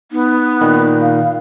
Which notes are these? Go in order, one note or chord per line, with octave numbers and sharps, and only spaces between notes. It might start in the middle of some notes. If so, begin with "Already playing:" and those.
B3 D#4
A#2 D#3
F5